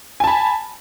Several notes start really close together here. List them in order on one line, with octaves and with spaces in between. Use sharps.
G#5 A5 B5